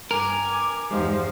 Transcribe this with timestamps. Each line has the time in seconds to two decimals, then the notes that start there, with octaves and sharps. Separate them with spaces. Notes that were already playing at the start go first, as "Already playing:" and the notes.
0.11 G2 A#4 G#5 D6
0.91 E2 G2 F3 G#3 D#4 G4